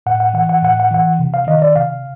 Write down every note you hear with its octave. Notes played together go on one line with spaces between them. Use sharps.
A2 F#5
F#5
E3 F#5
F#5
A2 F#5
F#5
E3 F#5
C3
F5
D#3 D#5
D5
C3 F5